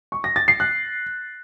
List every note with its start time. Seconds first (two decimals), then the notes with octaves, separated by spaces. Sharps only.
0.12 C#6
0.24 A#6
0.36 A6
0.48 C7
0.60 F#6